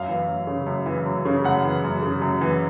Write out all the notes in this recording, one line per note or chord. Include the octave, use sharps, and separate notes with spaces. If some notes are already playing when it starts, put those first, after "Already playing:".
Already playing: F#2 F5
E3
F#2
C#3
F#2
E3
F#2
C#3
F#2 F#5
E3
F#2
C#3
F#2
E3